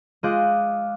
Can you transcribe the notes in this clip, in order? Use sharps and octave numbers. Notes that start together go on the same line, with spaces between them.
G#3 F4 D#5 D6 F#6 G6